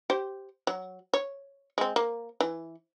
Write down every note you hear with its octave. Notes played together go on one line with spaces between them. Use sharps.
G4 C5
F#3
C#5
G#3 C4
A#3
E3